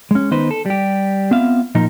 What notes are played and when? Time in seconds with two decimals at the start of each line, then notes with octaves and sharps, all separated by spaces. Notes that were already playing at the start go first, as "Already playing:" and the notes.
0.11 G#3 C#4
0.31 D#3 B3 D#4 B4 C5
0.51 A4
0.66 G3 G4
1.31 B3 C4 F4 E5 F5
1.75 A#2 F3 D#4 A#4